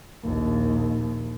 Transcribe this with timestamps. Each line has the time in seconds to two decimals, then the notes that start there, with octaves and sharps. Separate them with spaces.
0.23 A#1 D#2